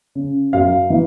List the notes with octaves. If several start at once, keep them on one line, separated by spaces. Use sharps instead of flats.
C#3
F#2 F5
E3